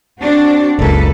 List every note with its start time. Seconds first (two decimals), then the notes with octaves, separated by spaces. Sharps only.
0.21 C4 D4 F#4
0.79 F#1 C#2 A#3 A4 B4